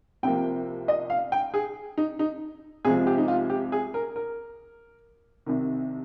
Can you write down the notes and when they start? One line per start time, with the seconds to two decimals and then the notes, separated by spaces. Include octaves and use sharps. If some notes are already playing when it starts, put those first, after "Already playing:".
0.23 C2 C3 F3 A#3 G5
0.88 D#5
1.10 F5
1.32 G5
1.54 G#4
1.98 D#4
2.19 D#4
2.85 C2 C3 F3 G#3 G#4
3.07 G4
3.18 D#4
3.28 F4
3.50 G4
3.72 G#4
3.94 A#4
4.16 A#4
5.46 C2 C3 D#3